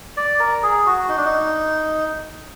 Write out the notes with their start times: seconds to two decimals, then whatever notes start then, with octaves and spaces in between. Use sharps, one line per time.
0.17 D5
0.39 A#4
0.63 G#4
0.86 F#4
1.09 D#4
1.17 D4
1.25 D#4